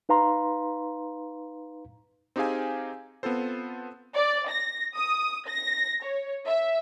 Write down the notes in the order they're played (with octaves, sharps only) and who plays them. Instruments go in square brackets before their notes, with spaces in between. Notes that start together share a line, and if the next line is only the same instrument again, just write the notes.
[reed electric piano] D#4 B4 F5 A#5 C6
[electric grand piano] C4 D#4 G4 G#4 F5 G#5
B3 C4 F4 A4 C5
[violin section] D5
A#6
D#6
A#6
C#5
E5